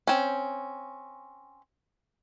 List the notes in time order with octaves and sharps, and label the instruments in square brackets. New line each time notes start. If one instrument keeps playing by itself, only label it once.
[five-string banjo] C4 C#4